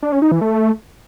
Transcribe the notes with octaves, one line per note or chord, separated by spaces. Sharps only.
D4
C#4
D#4
E3
A3